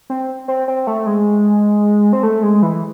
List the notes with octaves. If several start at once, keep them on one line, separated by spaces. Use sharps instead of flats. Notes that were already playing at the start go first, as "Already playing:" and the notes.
C4
C4
C4
A3
G#3
C4
A3
G#3
E3